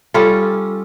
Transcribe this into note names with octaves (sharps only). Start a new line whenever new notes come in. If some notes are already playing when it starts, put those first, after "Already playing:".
G3 C#4 F4 A4